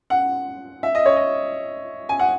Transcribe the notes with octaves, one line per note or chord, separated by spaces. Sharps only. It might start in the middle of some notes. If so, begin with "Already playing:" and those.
F#5
E5
D#5
C#5
D#5
G#5
F#5